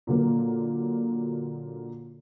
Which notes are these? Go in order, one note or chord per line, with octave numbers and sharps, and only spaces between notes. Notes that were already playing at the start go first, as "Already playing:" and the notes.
A#2 D3 F#3 A#3